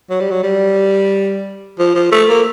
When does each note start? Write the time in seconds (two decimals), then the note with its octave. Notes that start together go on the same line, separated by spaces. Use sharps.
0.10 F#3
0.20 G3
0.31 F#3
0.43 G3
1.79 F3
1.95 F3
2.11 A3
2.29 A#3